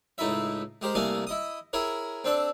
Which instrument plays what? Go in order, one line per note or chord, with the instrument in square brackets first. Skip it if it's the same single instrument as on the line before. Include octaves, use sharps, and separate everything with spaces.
[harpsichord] C#2 A2 D#4 E4 E5
G#3 G4 A#4 C5
C2 A3 A#3 F5 G#5
E4 D#5 D#6
E4 G#4 A#4 C#5
C4 D4 A4